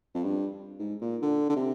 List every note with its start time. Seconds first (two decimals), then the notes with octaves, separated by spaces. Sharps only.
0.14 F2
0.24 G2
0.79 G#2
1.01 A#2
1.22 D3
1.49 D3
1.56 C3